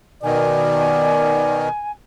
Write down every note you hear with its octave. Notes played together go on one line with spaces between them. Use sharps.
B2 D#3 D5 G#5